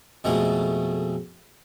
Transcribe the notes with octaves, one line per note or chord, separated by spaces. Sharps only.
F2 B2 G#3 A3